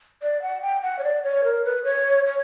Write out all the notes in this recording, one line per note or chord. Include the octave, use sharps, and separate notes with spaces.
D5
F#5
G5
F#5
C#5
D5
C#5
A#4
B4
C#5
C#5